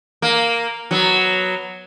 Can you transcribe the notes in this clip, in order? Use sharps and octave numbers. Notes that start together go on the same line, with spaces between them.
A#3
F#3 B3